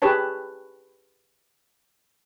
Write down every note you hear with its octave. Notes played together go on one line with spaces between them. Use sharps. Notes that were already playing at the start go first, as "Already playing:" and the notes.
G4 G#4 B4 C#5 A5